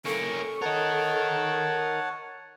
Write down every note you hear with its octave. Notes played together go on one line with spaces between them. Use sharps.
A#3 C#4 A4 C#6
A#4 C#5 D#5 F#5 A5